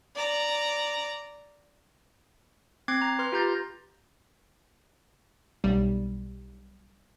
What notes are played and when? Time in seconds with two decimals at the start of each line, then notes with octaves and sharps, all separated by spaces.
0.15 D5 A#5
2.88 C4 D6 F#6 G#6 C7
3.02 A#5
3.19 B4 C6 F6
3.32 F4 G4 A#5 G6 A6 A#6
5.64 B1 G3